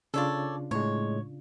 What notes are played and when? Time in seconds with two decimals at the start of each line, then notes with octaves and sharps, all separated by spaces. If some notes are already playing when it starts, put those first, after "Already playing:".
0.14 C#3 D4 F4 A4 C#5 D5
0.71 A2 G#3 C#5